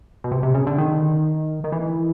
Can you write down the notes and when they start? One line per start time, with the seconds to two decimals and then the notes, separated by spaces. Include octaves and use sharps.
0.24 B2
0.31 C3
0.43 C3
0.54 C#3
0.67 D3
0.78 D#3
1.64 D#3
1.72 E3